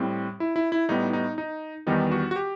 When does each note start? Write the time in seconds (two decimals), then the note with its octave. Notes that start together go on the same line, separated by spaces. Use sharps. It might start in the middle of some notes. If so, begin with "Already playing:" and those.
Already playing: A2 G3 C4
0.40 E4
0.56 E4
0.72 E4
0.89 A2 G3 B3 D#4
1.13 D#4
1.38 D#4
1.87 E2 D#3 G3 B3 D#4
2.12 F#4
2.31 F#4
2.36 G4